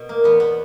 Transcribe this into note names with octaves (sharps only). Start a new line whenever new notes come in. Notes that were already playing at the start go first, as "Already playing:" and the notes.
Already playing: B2
A#3
E2 B3
B3